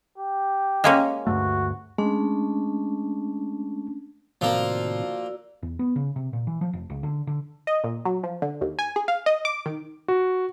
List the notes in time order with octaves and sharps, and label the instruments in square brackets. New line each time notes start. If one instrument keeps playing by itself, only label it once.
[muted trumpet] G4
[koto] G#3 A#3 C#4
[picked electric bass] D2 G2 A3 [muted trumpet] F#4
[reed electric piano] G#3 [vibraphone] A3 C#4 D4
[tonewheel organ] A2 C3 D#3 [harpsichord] F3 A#3 [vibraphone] F#4 D5 E6
[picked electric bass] E2
B3
C#3
C3
A#2
E3
F3
F1
C#2
D3
D3
[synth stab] D#5
A#2
F#3
F3
D3
D#2
G#5
G#4
F5
D#5
D6
D#3
[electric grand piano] F#4